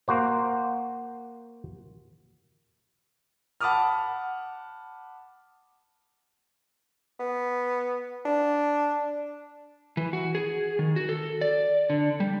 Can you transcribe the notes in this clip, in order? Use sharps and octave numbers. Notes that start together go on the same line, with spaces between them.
A#3 F#4 C5
F#5 A5 B5 D6 D#6 F6
B3
D4
E3
F#4
G#4
D#3
F#4
A4
D5
D3
G3